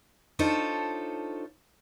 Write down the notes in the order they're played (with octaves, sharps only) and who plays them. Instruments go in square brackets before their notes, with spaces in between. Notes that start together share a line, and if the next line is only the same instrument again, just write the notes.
[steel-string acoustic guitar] D4 D#4 F4 A4 C5 C#5